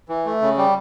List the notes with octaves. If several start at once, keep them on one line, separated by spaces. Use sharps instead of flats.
E3
A3
C#3
G3